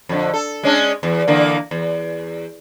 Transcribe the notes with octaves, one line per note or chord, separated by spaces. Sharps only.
F2 D3
A4
G#3 C#4 D4
E2
D3 E3 A#3
E2